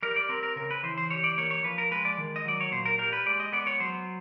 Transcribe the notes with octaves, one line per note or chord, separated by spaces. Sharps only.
G3 A#4
D5
C4 A#4
A#4
C#3 A#4
B4
E3 C5
C5
G3 C#5
D5
A#3 C#5
C#5
F3 B4
A#4
G#3 B4
D5
D#3
D#5
F#3 D5
C#5
A#2 C5
A#4
G3 A#4
B4
G#3 D5
D#5
B3 D5
C#5
F#3 C5